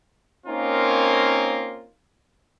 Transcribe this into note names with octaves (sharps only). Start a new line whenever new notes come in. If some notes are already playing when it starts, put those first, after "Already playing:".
A#3 C4 C#4 D#4 F4 A#4